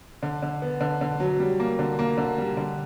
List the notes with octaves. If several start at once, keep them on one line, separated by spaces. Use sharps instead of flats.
D3
D3
B3
D3
D3
F#3
G3
A#3
D3
A#3
D3
G3
D3